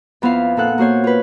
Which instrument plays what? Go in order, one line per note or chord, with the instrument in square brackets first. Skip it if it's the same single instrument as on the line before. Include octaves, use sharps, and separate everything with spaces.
[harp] F2 B3 E4 F4 F5
A#2 D#4 A4 F#5 F#6
A#3 F#4 C5 C#5
F4 B4